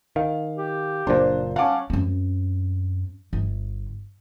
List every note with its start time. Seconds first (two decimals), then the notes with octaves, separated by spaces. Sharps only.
0.16 D#3 F5
0.58 G4
1.07 F#1 A#2 D4 C5
1.56 C#4 F5 F#5 A5 D6
1.90 F#2 C4
3.33 G1